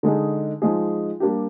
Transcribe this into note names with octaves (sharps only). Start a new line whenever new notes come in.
D3 G#3 D#4 G#4
F3 G#3 D#4 G#4
G3 A#3 D4 G4